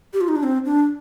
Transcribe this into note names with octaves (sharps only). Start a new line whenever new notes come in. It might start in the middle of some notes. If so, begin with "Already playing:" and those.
G4
F4
D#4
D4
C4
D4